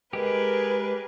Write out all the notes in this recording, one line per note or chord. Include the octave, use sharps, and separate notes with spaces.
G#3 G4 G#4 A#4 B4